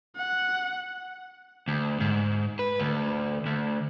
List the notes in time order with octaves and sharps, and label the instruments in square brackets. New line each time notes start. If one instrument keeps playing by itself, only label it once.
[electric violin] F#5
[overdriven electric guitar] D2
G#2
B4
D2
D2